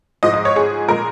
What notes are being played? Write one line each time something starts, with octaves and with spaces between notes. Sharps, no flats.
G#2 F3 G#3 D#5
D#5
C#5
G#4
A#2 G#3 A#4